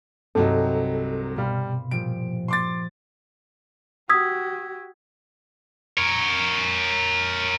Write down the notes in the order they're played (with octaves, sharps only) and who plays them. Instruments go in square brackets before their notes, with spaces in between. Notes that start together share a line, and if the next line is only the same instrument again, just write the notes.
[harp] C2 G2 [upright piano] C3 F#3 D#4 [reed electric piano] A4
[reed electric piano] B2 [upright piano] G3 [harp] F5 B5 C6
[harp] A#2 F3 G3 [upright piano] D7
[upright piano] C6 D6 A6
[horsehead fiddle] F#4 G4 [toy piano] D#6 [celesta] E6 G#6 B6
[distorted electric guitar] A#4 C#5